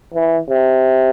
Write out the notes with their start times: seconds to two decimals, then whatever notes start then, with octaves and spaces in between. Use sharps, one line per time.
0.14 E3
0.49 C3